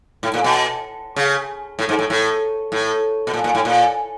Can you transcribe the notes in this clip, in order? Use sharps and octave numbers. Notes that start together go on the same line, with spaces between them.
A2
A#2
B2
C#3
A2
G#2
A2
A2
A2
B2
A#2
A#2
A2
A#2